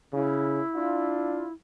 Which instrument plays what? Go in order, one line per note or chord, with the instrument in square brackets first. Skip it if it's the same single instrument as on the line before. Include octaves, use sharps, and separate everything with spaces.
[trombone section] C#3 [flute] E4
[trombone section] D4 F4